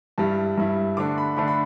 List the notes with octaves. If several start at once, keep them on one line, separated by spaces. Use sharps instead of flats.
G2 G3 E4 A5
G2 G3 E4
D3 A3 D4 D6
B5
D3 A3 D4 B5
B5